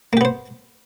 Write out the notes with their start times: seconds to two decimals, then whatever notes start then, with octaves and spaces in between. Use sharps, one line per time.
0.13 A#3
0.17 G4
0.21 B3
0.25 C5